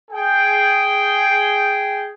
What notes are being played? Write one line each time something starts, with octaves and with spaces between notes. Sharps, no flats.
G#4 G5